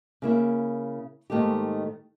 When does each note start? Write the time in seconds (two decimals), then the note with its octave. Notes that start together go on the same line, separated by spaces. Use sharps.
0.22 C#3 A#3 E4
1.30 G#2 D#3 A3 A#3 D#4 G4